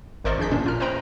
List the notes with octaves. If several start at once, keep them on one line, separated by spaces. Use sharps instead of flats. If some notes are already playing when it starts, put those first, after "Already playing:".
G#1 A#4 C5 D5 D#5 C#6
F2 D4 G#4 G6 B6
A#2 A#3 C#4 D4
F4 A#4 F6
B4 C5 D#5 G5 A#5 B5